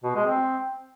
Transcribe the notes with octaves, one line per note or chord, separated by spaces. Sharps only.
B2
G#3
C4